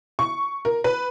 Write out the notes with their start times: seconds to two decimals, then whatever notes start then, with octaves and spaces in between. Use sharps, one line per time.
0.19 C#6
0.65 A#4
0.84 B4